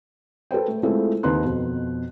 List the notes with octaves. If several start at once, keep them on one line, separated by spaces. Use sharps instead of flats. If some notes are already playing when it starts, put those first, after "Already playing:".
A4 B4 C5 G5
A3
G#3 A3 C4 E4 F4 A4
D#2 C4 D#4 B4 C6 F#6
F2 B2